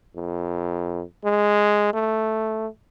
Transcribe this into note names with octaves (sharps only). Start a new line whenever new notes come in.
F2
G#3
A3